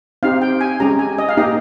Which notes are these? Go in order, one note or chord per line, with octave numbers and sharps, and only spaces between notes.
C4 D#4 G4 F5
G5
G#5
G#3 C#4 G4 A#5
G#5
D#5
F5
A#3 D#4 G4 D#5